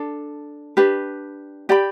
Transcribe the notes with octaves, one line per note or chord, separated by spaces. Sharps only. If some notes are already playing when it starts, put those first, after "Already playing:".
Already playing: D4 A4
D4 G4 B4
G4 D5 G5 B5